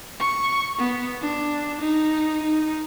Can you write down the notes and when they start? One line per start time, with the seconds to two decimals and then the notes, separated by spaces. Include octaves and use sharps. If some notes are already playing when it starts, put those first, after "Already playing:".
0.20 C#6
0.78 B3
1.21 D4
1.81 D#4
2.43 D#4